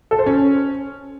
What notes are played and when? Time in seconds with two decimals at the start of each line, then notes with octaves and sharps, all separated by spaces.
0.11 A4
0.19 C5
0.26 C#4